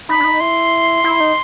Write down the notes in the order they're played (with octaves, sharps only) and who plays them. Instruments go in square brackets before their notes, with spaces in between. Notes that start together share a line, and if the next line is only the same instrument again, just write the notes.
[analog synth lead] D#4 [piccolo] B5
[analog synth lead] D4
D#4
[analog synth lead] E4 [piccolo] C6
[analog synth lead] E4
D#4